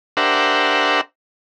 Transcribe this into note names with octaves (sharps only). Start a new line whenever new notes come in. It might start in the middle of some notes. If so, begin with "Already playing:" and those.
D4 G4 A#4 C5 E5 F#5